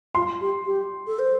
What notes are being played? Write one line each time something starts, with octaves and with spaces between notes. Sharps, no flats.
F4 C6
G4
G4
A4
C5